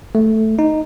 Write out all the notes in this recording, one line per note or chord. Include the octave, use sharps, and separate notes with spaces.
A3
D#4